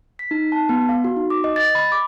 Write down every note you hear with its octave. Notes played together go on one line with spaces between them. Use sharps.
B6
D#4
A5
B3
F5
F#4
D#4
D6
D#5
A6
B5
D6